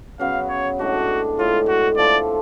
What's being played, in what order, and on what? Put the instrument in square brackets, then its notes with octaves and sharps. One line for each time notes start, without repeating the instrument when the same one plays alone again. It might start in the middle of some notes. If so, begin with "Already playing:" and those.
[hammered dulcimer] C#3 F#3 B3 [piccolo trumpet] F5
[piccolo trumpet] C#5
[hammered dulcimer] A2 G#3 D4 [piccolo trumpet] F#4
[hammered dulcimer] A2 G#3 D4 [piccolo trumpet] F4
[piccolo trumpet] F#4
[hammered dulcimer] F3 A3 D4 F4 [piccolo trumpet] D5